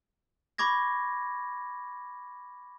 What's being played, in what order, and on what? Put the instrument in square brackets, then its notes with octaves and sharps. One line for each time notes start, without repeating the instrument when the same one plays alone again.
[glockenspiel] B5 C#6 D6 G#6 A#6